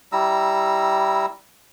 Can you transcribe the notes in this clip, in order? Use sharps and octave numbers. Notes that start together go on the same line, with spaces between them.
G3 E4 A#5 E6